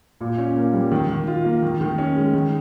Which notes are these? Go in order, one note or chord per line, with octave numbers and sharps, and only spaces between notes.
A#2
C#4
A#3
G3
D#3
D#3
F4
A#3
D#3
D#3
C#4
G#3
D#3